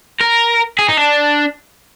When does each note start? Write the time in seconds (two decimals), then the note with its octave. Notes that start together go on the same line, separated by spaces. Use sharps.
0.20 A#4
0.79 G#4
0.88 D#4
0.97 D4